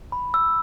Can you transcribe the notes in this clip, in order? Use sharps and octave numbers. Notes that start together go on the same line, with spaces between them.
B5
E6